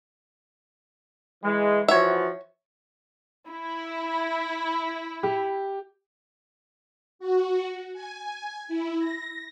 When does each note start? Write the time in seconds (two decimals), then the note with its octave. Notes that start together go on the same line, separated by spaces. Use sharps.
1.44 E3 G#3
1.88 E3 F3 F#4 C#5 E5
3.50 E4
5.23 G4
7.19 F#4
7.93 G#5
8.68 E4
8.98 A#6